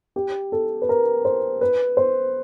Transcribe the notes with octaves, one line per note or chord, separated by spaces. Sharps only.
G4
A4
B4
A#4
C5
B4
C5